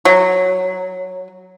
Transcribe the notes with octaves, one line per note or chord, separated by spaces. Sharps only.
F#3